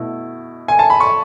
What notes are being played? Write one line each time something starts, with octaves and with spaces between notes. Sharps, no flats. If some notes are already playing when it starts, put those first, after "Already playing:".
Already playing: B2 A3 E4
G#5
A5
B5
C#6